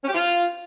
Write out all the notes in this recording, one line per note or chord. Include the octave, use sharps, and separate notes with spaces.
C#4
G4
F4